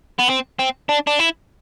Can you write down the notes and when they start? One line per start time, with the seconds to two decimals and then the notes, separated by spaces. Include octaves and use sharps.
0.19 B3
0.29 C4
0.59 C4
0.89 D4
1.07 D4
1.19 E4